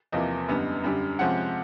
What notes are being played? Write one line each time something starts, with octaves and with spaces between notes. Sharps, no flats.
E2 C3 F3 A#3 D#5
F#2 D3 G3 B3
F#2 D3 G3
C3 F3 G#3 C#4 F#5